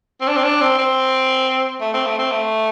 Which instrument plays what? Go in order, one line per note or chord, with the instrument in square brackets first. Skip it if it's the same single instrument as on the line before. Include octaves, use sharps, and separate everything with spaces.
[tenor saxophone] C4
D4
C4
D4
C4
C4
A3
C4
A3
C4
A3